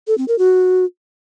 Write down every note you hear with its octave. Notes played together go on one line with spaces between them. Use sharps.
A4
C4
A#4
F#4